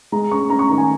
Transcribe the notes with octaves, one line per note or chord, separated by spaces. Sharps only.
G#3 A#5
C#4 C#6
C#4 A#5
C#6
D#3 A#5
G#5